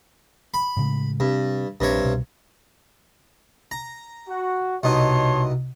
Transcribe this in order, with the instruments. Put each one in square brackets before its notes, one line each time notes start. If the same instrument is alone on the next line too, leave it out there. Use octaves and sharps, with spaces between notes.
[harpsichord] B5
[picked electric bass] A2 C#3 G#3
[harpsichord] G2 [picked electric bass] C3 C4
[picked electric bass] A#1 G3 [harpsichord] G2 C3 C#5
[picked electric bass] C2 B2
[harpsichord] A#5
[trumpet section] F#4
[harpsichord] C2 B2 D#4 [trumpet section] C#5 A5 C6